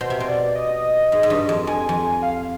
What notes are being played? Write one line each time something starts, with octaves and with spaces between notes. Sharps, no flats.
B2 C5
C3
B2
D5
D#5
G#2
G#2
G2
F2
F2 G#5
F2
F5